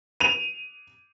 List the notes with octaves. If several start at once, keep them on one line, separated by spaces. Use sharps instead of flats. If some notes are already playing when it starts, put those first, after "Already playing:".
D#7 F7